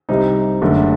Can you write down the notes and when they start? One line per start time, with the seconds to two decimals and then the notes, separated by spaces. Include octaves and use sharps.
0.09 C2 C3 G3 C4 D#4
0.62 F#1 F#2 D3 A3